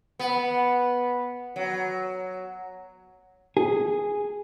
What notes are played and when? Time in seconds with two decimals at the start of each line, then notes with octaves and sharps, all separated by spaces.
0.19 B3
1.56 F#3
3.57 G#4